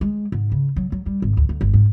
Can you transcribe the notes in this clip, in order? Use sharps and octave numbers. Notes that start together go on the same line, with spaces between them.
G#3
G#2
C#3
F#3
F#3
G3
G#1
D2
D2
G1
G#2